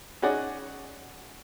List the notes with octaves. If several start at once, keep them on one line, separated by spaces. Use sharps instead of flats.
C#4 D#4 F#4 G#4 D5 F#5